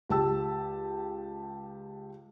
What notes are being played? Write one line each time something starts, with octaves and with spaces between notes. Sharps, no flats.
C#2 G4 A5 E6